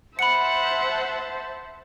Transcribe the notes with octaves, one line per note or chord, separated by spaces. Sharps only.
C5 E5 F#5 A5 B5 C#7